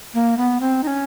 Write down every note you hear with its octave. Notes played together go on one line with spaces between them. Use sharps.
A#3
B3
C4
D#4
C#4